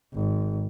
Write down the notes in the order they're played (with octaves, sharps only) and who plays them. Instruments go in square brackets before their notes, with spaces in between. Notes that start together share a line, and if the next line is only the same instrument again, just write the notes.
[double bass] G#1